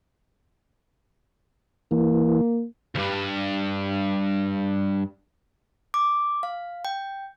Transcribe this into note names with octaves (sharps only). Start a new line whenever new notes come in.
E3 A#3
C#2 G2
D6
F5
G5